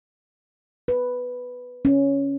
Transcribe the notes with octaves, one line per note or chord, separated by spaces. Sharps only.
B4
C#4